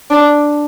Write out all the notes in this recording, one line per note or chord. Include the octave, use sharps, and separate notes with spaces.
D4